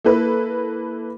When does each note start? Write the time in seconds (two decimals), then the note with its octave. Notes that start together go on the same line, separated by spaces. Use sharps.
0.04 A#3 E4 A4 B4